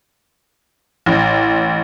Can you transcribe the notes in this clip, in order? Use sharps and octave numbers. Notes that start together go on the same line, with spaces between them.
A1